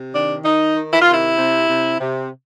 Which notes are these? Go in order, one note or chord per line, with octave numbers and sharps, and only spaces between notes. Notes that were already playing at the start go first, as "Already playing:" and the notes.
Already playing: C3
D#3 D4
D#3 D#4
D#3
E4
F4
C3 E4
C3
C3
C3